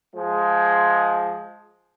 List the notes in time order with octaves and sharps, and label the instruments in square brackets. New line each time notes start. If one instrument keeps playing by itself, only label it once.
[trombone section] F3 G#3